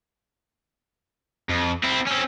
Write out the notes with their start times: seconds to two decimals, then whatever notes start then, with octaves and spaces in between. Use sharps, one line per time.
1.50 F2
1.84 C4 E4
2.07 C4 C#4